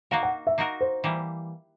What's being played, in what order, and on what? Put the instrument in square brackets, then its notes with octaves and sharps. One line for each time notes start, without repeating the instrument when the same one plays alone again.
[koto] A#3 D#4 F#4 A#4 [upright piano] F5
[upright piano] F#5
E5
[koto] A#3 D#4 F#4 A#4
[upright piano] C5
[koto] E3 G3 A#3